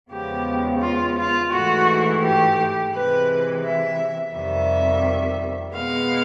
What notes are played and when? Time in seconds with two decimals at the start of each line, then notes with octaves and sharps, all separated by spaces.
0.11 E2 C#3 F3 G#3 B3 G4
0.81 F4
1.16 F4
1.52 G#2 E3 A3 F#4
2.22 G4
2.93 C3 E3 G#3 B4
3.63 E5
4.34 F2 C3 D#3 G3 E5
5.75 B2 G#3 B3 F5